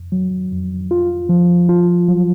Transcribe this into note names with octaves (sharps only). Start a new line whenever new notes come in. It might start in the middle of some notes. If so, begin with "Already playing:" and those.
Already playing: F2
F#3
F2
F4
F3
F4
F#3